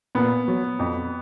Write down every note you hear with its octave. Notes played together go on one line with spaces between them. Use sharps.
A#2 B3
F#3
F2